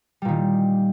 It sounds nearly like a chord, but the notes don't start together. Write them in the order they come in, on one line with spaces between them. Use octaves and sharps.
G3 A#2 D#3